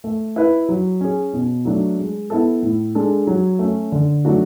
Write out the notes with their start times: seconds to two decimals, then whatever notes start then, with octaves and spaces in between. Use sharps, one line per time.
0.04 A3
0.36 E4 B4
0.69 F#3
1.01 C#4 G#4
1.33 B2
1.65 F#3 A3 D4
1.98 G#3
2.30 B3 E4 A4
2.62 A2
2.95 G#3 D4 A4
3.27 F#3
3.59 A3 C#4
3.92 D3
4.25 F#3 A3 D4 F#4